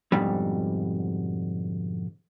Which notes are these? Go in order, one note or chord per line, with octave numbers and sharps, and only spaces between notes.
F2 G#2 B2 D3 G3